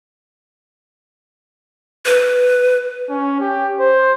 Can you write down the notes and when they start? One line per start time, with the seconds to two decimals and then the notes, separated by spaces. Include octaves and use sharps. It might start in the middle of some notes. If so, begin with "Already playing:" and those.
2.06 B4
3.09 C#4
3.40 G4
3.80 C5